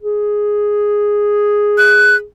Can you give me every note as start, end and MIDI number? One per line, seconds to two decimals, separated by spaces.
0.02 2.24 68
1.78 2.16 90